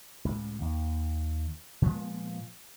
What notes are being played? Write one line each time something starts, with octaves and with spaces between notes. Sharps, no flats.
C#2 A2
D#2
A#2 F3 G#3 B3